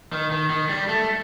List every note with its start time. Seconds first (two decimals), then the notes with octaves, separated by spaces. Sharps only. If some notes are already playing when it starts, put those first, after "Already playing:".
0.13 D#3
0.31 D#3
0.50 D#3
0.69 G3
0.89 A3